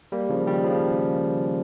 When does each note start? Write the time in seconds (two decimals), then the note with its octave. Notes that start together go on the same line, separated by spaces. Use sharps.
0.12 G3 A#3
0.29 C#3 F3
0.47 D#3 G3
0.64 C#3 F3